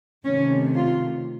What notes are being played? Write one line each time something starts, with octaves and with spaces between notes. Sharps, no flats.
C3 D#3 A3 C#4
F4